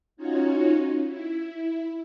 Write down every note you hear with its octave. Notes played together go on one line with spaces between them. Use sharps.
C#4 D#4 F4 F#4 C#5
E4